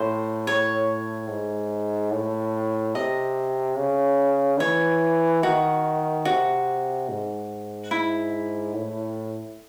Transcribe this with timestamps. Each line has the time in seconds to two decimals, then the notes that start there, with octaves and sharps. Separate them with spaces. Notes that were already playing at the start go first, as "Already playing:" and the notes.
Already playing: A2 C5
0.47 C#5
1.29 G#2
2.13 A2
2.95 C3 D#5
3.78 C#3
4.60 E3 C#5
5.43 D#3 F#4
6.25 C3 F#4
7.09 G#2
7.91 E4
8.74 A2